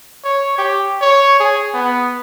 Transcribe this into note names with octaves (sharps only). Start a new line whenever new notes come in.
C#5
G4
C#5
G#4
B3